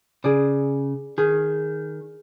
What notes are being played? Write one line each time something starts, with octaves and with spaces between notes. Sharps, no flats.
C#3 G#4 D5
D#3 G#4